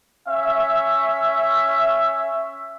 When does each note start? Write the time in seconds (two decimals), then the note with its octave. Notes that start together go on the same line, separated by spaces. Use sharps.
0.28 C#4 E5